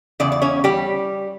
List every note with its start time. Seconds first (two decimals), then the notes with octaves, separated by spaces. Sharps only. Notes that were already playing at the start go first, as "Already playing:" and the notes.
0.20 E2 C#3 D5
0.32 D5
0.42 C#4 C#5
0.64 G3 G4